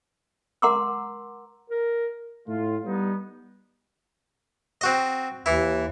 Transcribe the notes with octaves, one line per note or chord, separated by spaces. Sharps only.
A#4 F#5 A#5 C6 D6 E6
A#4
A2 F4
G3 B3 D#4
C4 F#4 D#5
D#2 E3 E4